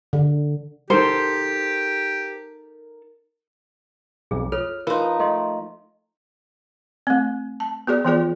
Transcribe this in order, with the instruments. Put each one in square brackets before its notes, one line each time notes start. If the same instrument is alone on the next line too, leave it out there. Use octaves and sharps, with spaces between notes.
[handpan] D3
[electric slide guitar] D#4 A4 A#4 [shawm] G4 [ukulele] C5
[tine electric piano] B1 F2 [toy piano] G#4
[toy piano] F4 A4 C#5 [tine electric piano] F6
[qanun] F3 D#4 [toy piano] A#4 C6 [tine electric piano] B4
[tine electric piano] A3 [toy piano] D#5 C6
[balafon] A3 C4
A5
B3 F#4 G#4 D5
E3 F3 B3 F4 G#4 D5